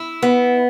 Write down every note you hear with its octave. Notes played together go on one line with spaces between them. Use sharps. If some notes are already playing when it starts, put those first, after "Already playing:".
Already playing: E4
B3